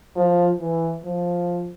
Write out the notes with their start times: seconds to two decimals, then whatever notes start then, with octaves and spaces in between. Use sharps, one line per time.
0.16 F3
0.60 E3
1.04 F3